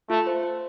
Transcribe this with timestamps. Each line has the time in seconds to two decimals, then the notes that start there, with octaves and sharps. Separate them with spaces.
0.10 A3 F4
0.27 C5
0.43 C5